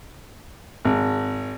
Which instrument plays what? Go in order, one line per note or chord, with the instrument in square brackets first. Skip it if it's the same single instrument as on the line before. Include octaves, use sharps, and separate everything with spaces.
[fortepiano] G#1